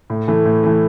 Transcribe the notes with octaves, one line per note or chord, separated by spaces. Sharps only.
A2
E3 A3
A2
E3 A3